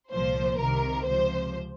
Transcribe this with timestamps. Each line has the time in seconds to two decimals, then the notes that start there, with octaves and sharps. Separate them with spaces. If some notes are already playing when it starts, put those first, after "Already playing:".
0.11 C2 A#2 F3 C5
0.58 C2 C3 D#3 A#4
1.05 C#2 C3 F3 C5